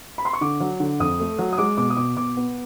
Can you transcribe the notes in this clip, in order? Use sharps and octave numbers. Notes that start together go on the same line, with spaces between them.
B5
C6
C#6
D3 D6
F#3
D3
F2 D#6
A3
F#3
D#6
G#3 D6
B2 D6
D#6
B2 D6
B2 D6
B3